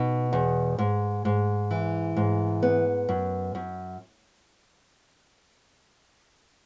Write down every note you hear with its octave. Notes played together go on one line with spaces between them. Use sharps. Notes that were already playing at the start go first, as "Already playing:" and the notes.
Already playing: B2 D#4
E2
G#2
G#2
E3
G#2
B3
F#2
F#2